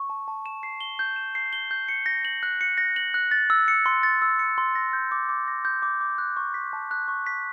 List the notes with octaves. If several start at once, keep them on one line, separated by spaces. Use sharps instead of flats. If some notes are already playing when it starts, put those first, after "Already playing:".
Already playing: C#6
A5
A5
E7
C7
G7
G6
E7
C7
G7
G6
C#7
A#6
F#7
F#6
C#7
A#6
F#7
F#6
A6
E6
C#7
C6
A6
E6
C#7
C6
A#6
G6
D6
D6
A#6
G6
D6
D6
F#6
C#6
B6
A5
F#6
C#6
B6